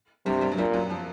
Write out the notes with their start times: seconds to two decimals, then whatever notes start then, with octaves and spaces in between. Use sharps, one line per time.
0.26 G2 C3 G3
0.41 G2 G3
0.52 F#3
0.57 G2 A#2 G3
0.74 F#2 F#3
0.90 F3